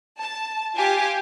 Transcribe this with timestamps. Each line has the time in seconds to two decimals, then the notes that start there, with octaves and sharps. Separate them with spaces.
0.20 A5
0.75 F4 G4 G#5